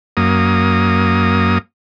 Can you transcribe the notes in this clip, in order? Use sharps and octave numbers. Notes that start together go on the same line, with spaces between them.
F#2 A#3 D#6